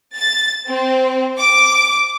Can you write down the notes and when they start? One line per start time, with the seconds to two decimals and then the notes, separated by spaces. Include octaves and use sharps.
0.16 A6
0.67 C4
1.39 D6